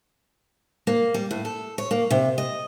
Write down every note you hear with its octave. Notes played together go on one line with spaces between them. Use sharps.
A#3
G3
A2
A4
C#5
A#3
C3
D#5